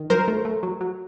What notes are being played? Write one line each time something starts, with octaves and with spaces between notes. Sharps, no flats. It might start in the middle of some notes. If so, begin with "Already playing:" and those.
Already playing: D#3
F#3 A#4 C5
A3
A3
F#3
F#3